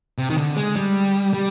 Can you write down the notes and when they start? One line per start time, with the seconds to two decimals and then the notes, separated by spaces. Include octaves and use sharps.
0.18 C3
0.30 D#3
0.38 D3
0.57 G#3
0.76 G3
1.34 G3